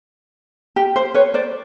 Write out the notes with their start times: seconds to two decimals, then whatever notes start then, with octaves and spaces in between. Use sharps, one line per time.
0.76 G4
0.96 C5
1.14 B4 C#5
1.34 C5 D5